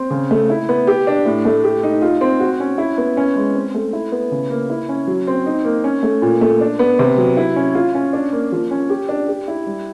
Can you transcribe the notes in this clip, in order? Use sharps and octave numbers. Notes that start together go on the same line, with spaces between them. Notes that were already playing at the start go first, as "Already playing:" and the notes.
Already playing: C4
C#3
A3
E4
B3
G4
D4
A2
A3
G4
D#4
F4
C4
F#4
C#4
E4
B3
C#4
G#3
C4
A3
E4
B3
C#3
A#3
E4
C#4
F#3
C4
D#4
A#3
C#4
A3
A#2
A3
D4
B3
C3
F#3
E4
C#4
F4
C#4
D4
A#3
F3
C#4
G4
D4
G4
E4
G3